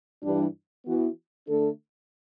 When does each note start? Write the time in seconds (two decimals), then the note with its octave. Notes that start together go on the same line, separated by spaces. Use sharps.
0.23 G2 E3 G3 D4
0.85 E3 B3 F#4
1.47 D3 A3 D4 A4